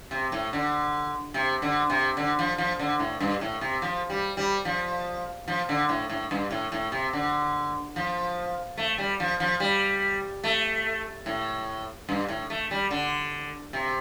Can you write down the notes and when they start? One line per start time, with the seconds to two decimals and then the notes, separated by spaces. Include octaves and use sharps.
0.11 C3
0.32 A2
0.53 D3
1.34 C3
1.62 D3
1.90 C3
2.17 D3
2.39 F3
2.58 F3
2.79 D3
2.99 A2
3.20 G2
3.41 A2
3.61 C3
3.82 F3
4.10 G3
4.37 G3
4.65 F3
5.48 F3
5.69 D3
5.89 A2
6.09 A2
6.31 G2
6.51 A2
6.72 A2
6.92 C3
7.13 D3
7.96 F3
8.77 A3
8.98 G3
9.20 F3
9.40 F3
9.60 G3
10.44 A3
11.26 A2
12.09 G2
12.28 A2
12.50 A3
12.71 G3
12.91 D3
13.73 C3